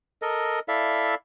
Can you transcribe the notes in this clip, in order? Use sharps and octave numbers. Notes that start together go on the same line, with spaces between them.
A4 A#4 D#5
E4 A4 D5 E5 F5